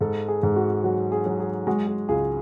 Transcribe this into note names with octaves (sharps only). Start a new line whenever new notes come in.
G#2 A4
G#4
G#2
F#4
F#3 F#4
G#4
F#3
G#4
G#3 F#4
G#4
C#2 G#4